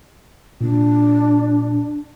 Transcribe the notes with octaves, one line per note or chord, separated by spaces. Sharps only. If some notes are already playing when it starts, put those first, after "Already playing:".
A#2 D4